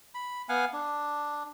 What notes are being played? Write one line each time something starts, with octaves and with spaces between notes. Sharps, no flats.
B5
B3 F5 F#5 G#5
D4